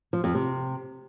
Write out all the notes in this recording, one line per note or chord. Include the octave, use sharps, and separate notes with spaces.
F3
F2
C3